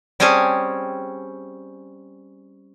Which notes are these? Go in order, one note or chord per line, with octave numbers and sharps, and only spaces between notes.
G3 C4 C#4 G#4 G#5 A5